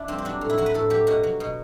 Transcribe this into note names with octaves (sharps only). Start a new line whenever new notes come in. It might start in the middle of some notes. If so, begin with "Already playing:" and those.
Already playing: D4 E4
G2 C4
C4
F#3 D4
A2
E4
F#3 F#4
B4
A2 A4
F#3 G4
B2 F#4
F#3
B2